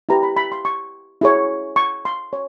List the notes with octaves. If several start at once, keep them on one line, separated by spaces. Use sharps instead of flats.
E4 G4 B4 A#5
B5
B5
C6
C#6
E4 G#4 C#5
C#6
C6
C#5